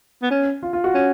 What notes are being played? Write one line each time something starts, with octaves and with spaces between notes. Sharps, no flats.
B3
C#4
F4
F4
F#4
C#4